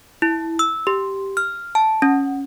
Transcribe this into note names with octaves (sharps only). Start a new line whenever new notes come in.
E4
E6
G4
F6
A5
C#4